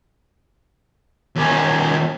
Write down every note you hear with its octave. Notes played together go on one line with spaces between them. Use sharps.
D#2 C#4